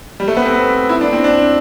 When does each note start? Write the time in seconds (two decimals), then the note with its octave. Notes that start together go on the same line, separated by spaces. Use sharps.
0.20 G3
0.28 A3
0.37 B3
0.46 C4
0.89 E4
1.01 D4
1.13 C4
1.24 D4